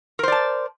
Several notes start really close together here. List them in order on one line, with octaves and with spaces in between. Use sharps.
A#4 C5 D5 A5